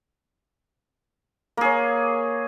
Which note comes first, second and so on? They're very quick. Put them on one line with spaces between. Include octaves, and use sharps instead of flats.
A#3 G#4 C#5